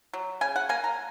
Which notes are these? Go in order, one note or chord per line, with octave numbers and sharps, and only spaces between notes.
F#3
C#3 G#5
F#5
A#3 G#5
A#5